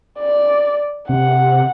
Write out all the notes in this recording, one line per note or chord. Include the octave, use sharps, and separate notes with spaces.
D5
C3 F#5